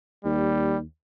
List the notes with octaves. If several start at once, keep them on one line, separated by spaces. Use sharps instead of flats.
D#2 G3